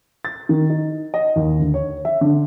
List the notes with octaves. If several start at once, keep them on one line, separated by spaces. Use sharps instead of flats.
A6
D#3
D#4
D#5
D#2
D2
C#5
E5
D3